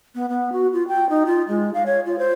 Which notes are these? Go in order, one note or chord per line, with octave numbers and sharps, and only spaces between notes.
B3
B3
F#4
F4
G5
D#4
F4
G#3
F5
C#5
F4
C5